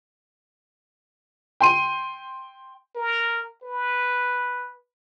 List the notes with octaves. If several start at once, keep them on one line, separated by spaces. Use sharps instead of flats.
G5 C6 D#7
A#4
B4